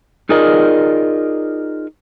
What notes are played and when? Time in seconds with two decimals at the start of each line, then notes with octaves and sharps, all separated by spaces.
0.29 D#4 F4 G#4 A#4 D5 D#5